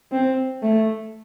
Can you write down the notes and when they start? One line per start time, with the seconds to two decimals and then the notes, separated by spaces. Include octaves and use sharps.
0.12 C4
0.62 A3